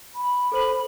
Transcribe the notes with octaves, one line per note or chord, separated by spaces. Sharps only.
B5
A4 C5 F#7